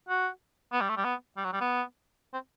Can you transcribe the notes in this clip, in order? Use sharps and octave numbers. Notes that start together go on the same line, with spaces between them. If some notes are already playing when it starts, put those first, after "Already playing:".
F#4
B3
G3
A3
G3
B3
G3
F#3
G3
B3
C4